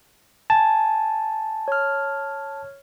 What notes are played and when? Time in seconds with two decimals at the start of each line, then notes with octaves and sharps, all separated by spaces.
0.50 G#5 A5
1.68 C#5 F6